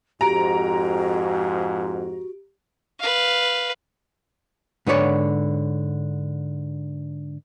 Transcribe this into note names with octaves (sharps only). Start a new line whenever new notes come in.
F2 G#2 F#4 G4 A#5 D7
B4 F5
G#2 D3 B4 C#5 D5